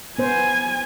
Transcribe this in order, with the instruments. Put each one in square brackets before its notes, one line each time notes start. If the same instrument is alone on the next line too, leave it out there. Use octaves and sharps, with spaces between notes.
[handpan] B3 C5 [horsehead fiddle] G#5